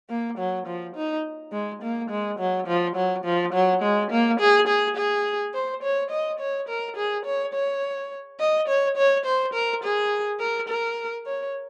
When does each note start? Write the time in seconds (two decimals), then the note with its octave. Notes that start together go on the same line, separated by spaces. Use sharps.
0.10 A#3
0.38 F#3
0.66 F3
0.96 D#4
1.52 G#3
1.82 A#3
2.10 G#3
2.39 F#3
2.67 F3
2.96 F#3
3.25 F3
3.53 F#3
3.82 G#3
4.11 A#3
4.40 G#4
4.68 G#4
4.96 G#4
5.54 C5
5.83 C#5
6.11 D#5
6.40 C#5
6.69 A#4
6.97 G#4
7.25 C#5
7.54 C#5
8.40 D#5
8.68 C#5
8.97 C#5
9.25 C5
9.54 A#4
9.83 G#4
10.40 A#4
10.68 A#4
11.26 C#5